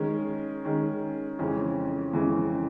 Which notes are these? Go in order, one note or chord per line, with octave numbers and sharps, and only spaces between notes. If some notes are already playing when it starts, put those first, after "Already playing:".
Already playing: D#3 G#3 C#4
D#3 G#3 C#4
F2 C#3 E3 G#3 C#4
F2 C#3 E3 G#3 C#4